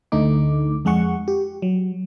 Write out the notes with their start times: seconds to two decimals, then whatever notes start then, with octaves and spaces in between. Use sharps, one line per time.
0.12 D2 D3 A3 D#4 D6
0.85 F2 G#3 G#4 F#5 C#6
1.28 G4
1.62 F#3